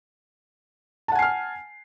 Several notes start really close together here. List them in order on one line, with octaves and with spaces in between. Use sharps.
A5 F#5 G#5 C7 F6